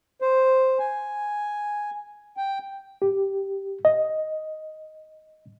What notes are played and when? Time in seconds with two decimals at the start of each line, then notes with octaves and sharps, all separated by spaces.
0.22 C5
0.79 G#5
2.37 G5
3.02 G4
3.85 D#5